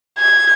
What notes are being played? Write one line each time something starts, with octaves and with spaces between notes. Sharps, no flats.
G#6